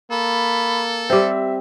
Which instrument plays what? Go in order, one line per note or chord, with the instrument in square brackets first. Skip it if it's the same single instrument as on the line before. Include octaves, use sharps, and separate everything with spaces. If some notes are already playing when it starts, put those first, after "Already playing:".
[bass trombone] A#3 [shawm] A4 [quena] B5
[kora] G3 C4 [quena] E5